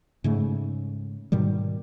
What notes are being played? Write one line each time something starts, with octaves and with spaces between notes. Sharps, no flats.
G#2 C#3 A3
G#2 B2 D#3 G3